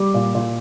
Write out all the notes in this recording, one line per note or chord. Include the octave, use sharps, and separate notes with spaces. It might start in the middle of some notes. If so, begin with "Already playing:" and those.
Already playing: G3 D6
A#2
A#2